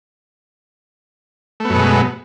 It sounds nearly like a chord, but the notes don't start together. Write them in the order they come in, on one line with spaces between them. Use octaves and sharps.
A3 B3 F#2 B2 G#3